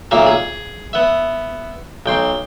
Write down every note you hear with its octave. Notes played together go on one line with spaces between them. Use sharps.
B1 A#2 A#3 E5 F5
G#4
B3 E5
B1 G5 C6